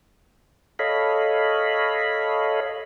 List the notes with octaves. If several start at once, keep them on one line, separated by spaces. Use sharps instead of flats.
A4 C#5 D#5 F5 B5